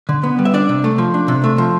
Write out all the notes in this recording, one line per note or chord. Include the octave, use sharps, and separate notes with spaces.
D3
B3
G3
E5
D4 D5
C3
A3
F3
D4
C3
A3
F3